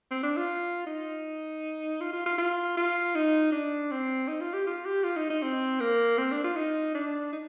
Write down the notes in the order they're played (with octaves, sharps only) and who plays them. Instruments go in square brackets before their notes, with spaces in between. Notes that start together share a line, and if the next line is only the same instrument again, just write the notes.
[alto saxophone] C4
D4
F4
D#4
F4
F4
F4
F4
F4
D#4
D4
C4
D#4
F4
G4
F4
G4
F4
D#4
D#4
C4
A#3
C4
D4
F4
D#4
D4
D#4